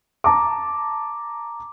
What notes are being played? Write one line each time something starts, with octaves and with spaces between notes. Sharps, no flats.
A5 A#5 D6